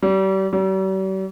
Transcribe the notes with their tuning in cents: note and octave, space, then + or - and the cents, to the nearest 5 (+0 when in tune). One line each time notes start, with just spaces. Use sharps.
G3 -35
G3 -45